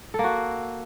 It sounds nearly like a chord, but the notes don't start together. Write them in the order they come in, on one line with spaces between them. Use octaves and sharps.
A4 A#3 F#4